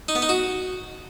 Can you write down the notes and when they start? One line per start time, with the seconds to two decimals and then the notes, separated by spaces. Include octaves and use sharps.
0.09 D#4
0.15 B3
0.22 D#4
0.29 F#4